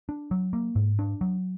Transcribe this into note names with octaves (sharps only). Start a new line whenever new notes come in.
D4
F#3
A#3
G#2
D4
F#3